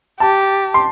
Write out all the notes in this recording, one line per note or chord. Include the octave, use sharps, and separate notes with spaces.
G4 A5
C6